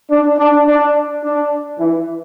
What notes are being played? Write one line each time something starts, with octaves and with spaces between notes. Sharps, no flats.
D4
D4
D4
D4
E3